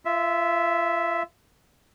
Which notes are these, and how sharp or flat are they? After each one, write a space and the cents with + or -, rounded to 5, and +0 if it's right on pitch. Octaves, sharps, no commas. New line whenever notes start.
F4 -30 E5 +0